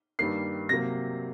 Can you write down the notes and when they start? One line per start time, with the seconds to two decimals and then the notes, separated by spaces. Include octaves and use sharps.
0.19 G2 D#3 G3 A#3 C7
0.69 C3 F#3 A#3 A#6